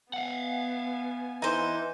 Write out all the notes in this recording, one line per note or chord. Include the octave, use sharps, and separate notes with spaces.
B3 F5 F#5 G#5
E3 D#4 C5